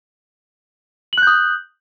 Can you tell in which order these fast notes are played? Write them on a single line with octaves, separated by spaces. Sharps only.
F#7 F#6 G6 D#6